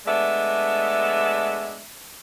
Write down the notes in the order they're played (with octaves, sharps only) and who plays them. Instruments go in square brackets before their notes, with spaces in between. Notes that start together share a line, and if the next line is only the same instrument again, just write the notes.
[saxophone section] G#3 A3 B3 D4 D5 E5